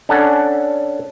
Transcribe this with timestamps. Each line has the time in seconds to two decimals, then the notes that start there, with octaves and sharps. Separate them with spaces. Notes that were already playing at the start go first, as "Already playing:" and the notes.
0.09 C#4 D4 A4 F#5